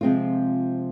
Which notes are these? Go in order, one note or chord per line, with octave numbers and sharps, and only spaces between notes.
C3 F3 G#3 C4 F4